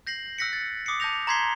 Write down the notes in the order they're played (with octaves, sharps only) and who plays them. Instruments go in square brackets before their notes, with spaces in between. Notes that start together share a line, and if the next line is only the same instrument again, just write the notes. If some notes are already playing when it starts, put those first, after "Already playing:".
[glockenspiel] G6 A#6 C7 F#7
E6 F#6 A#6 B6 C#7
A6
D6 D#6 A#6 C7 C#7
A5 D6 G6 A#6 F7
A#5 C6 G#6 B6 C7 G7